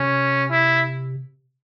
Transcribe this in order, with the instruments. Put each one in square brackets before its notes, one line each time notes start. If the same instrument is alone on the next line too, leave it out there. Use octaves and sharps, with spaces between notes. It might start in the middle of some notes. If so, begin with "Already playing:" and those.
Already playing: [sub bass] C3 [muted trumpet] C#4
[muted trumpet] E4